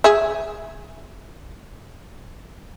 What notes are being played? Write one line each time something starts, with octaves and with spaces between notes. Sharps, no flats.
G#4 E5